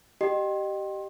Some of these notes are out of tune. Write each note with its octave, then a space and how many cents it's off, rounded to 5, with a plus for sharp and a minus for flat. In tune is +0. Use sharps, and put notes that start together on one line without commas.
G4 -15 D#5 -30